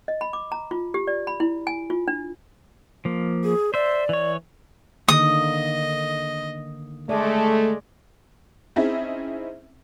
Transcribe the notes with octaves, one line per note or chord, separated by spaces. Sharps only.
D#5
B5
D6
A#5
F4
G4
D5
B5
E4
G#5
F4
D4
F3 A#3
G#4
C5 D5 E5
E3 C#5
D3 D#3 A#3 D#5 D#6
G#3 A3 D5
C4 C#4 D#4 E4 G#4 E5